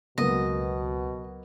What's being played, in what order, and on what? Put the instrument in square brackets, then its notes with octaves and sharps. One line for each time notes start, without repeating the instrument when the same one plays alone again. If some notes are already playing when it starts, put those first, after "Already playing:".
[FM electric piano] C#2 [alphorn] B2 [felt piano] F#3 A#3 B3 [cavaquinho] D#5